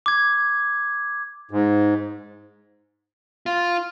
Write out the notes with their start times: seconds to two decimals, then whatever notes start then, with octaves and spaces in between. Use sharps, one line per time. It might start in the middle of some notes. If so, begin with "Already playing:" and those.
0.06 D6 G#6
1.51 G#2
3.46 F4